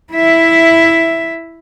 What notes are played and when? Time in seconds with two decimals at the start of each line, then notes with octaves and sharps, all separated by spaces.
0.12 E4 E5